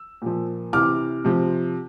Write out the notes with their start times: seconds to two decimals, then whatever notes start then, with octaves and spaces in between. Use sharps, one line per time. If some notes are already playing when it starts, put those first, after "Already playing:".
Already playing: E6
0.22 A#2 F3
0.73 C3 E3 D6 F6
1.25 C3 F3